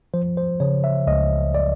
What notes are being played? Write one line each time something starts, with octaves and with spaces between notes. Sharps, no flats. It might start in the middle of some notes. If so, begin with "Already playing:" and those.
F3 C5
C5
C#3 C#5
E5
C#2 D#5
D5